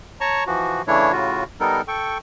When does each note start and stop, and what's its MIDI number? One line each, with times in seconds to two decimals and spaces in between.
0.21 0.44 73
0.21 0.44 81
0.21 0.44 82
0.21 0.44 85
0.47 0.82 52
0.47 0.82 53
0.47 0.82 66
0.87 1.12 49
0.87 1.12 52
0.87 1.12 57
0.87 1.12 62
0.87 1.12 64
0.87 1.12 73
1.12 1.44 45
1.12 1.44 49
1.12 1.44 65
1.12 1.44 66
1.60 1.82 55
1.60 1.82 59
1.60 1.82 63
1.60 1.82 69
1.60 1.82 70
1.88 2.18 69
1.88 2.18 79
1.88 2.18 85